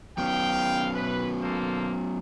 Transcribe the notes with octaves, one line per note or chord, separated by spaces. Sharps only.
F#3 B3 C#4 F5 G5
B4
A#3 A4 C5